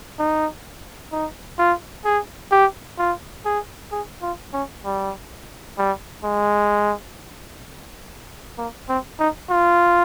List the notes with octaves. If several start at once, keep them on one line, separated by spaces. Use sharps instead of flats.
D#4
D#4
F4
G#4
G4
F4
G#4
G#4
F4
C#4
G3
G3
G#3
A#3
C4
D#4
F4